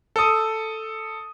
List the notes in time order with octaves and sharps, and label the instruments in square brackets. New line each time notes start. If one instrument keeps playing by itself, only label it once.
[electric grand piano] A4 D#6